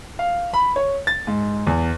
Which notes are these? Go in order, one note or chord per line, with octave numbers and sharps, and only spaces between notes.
F5
B5
C#5
A6
G#2
E2